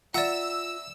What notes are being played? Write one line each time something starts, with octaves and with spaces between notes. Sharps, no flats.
F4 D5 E5 F#5 A#5 E6